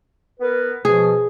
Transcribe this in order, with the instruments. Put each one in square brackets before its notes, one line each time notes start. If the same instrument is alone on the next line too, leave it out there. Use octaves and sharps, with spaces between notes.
[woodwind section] B3 A#4 B4
[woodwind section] B2 F3 [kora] G#4